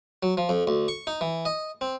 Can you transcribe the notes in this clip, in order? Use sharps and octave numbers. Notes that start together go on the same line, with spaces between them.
F#3
F3
F2
D2
C#6
D#4
E3
D#5
C4